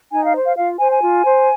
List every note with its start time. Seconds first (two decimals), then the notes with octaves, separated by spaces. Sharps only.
0.12 D#4 G#5
0.23 F5
0.35 C5
0.46 F5
0.57 F4 F5
0.79 C5 G#5
0.92 G#5
1.02 F4
1.25 C5